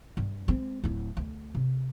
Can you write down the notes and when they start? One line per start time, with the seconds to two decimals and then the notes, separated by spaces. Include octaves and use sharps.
0.17 G2
0.48 G#3 C4
0.84 D1 E4
1.17 D2
1.55 C3